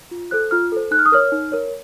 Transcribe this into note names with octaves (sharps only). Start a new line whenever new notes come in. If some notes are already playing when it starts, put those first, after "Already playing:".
F4
A4 C5 F#6
F4 F6
A4 C5
D#4 F#6
F6
D#6
A#4 C#5 F6
D#4
A#4 C#5